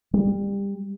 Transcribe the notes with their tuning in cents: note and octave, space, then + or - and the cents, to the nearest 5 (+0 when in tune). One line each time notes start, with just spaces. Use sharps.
G3 +25